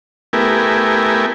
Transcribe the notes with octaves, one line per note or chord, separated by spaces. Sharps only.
A3 B3 E4 G4 A#4 G#5